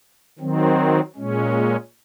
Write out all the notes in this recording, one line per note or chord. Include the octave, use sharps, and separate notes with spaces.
D#3 F#3 C4
A#2 G#3 C#4